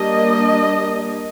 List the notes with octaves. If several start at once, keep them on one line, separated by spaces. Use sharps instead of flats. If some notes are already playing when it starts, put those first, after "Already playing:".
Already playing: G3 A#3 D4 D#5